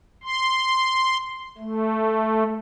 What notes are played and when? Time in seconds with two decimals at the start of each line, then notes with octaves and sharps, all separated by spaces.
0.24 C6
1.58 A3